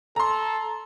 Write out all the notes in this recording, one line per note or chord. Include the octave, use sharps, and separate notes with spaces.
A4 A#5 C6